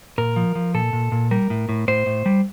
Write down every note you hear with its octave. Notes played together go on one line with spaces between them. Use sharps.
A#2 A#4
F3
F3
A#2 A4
A#2
A#2
G3 A#4
A2
A2
A2 C5
A2
G3